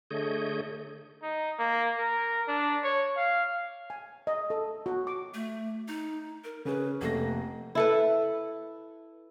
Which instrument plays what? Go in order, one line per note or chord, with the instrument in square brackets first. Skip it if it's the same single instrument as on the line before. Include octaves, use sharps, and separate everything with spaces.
[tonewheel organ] D3 A3 G#4 C#5 D#5 G6
[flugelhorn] D#4
A#3
A#4
D4
C#5
F5
[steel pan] G#5
D#5
A4
F#4
D6
[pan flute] A3
D#4
A#4
[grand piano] C#3 C#4 G#4 [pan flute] B4
[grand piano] F1 A3 A#6 [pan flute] A#3
[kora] E4 A4 B4